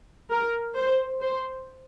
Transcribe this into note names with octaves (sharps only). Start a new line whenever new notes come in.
A#4
C5
C5